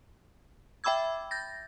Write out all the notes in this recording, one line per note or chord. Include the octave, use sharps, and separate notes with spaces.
E5 G5 B5 D6 E6 G#6
G6 A6 A#6